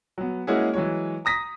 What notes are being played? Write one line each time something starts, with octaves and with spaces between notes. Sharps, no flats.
F#3 B3
G#3 A#3 C#4 E4 F#4 G#4
E3 F#3 G#3 C#5
A#5 D#6 A#6 B6